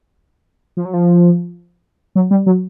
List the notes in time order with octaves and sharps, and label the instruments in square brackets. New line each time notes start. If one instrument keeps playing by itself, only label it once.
[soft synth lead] F3
F#3
F3
F#3
G3
F#3